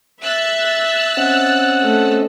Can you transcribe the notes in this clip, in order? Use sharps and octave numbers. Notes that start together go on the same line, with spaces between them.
E5 E6 F#6 A6
C4 C#4 D#5 F#5
A3